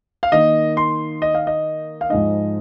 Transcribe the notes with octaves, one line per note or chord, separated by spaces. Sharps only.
F5
D#3 A#3 D#4 D#5
C6
D#5
F5
D#5
F5
G#2 F3 G#3 D#4 D#5